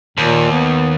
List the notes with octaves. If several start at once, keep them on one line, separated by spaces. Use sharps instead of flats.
D#2 A#2
B3